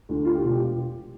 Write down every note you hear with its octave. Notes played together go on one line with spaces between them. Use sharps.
D2 D3
F4
G4
E1 F4
G4